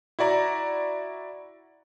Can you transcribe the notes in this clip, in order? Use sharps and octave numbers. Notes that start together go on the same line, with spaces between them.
E4 F#4 D5 A#5